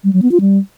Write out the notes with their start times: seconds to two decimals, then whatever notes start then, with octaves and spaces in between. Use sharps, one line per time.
0.04 G3
0.13 F#3
0.22 B3
0.31 F4
0.41 G3